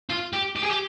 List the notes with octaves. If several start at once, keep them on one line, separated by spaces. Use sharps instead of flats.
F4
G4
G4
G#4
G4